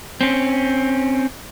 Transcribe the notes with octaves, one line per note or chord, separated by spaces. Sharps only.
C4 C#4